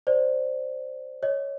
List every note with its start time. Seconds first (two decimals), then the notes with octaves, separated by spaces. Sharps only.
0.07 C5 D5
1.23 C#5 D#5